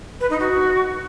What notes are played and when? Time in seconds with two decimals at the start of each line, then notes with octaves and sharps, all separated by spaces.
0.20 B4
0.30 D#4
0.39 F#4